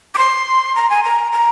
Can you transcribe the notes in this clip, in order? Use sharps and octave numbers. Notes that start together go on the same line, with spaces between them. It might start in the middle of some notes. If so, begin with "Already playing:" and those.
D6
C6
A#5
G#5
A#5
A#5